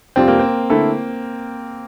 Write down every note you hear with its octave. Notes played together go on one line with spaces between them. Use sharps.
F2 C3 G3 C4 D4 F4
A#3
C4
D3 A3 E4 A4